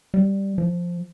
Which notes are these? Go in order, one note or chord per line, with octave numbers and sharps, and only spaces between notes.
G3
F3